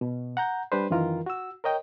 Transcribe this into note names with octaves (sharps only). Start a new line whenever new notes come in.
B2
F#5 A#5 G6
G3 D4 B4 C5
F#2 D#3 E3 F4 A#4
F#4 E6
A#4 C#5 D#5 G5